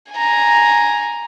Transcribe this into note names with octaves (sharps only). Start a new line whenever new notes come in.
G#5 A#5